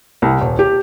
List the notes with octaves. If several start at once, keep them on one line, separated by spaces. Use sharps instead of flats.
C2
D#1
G4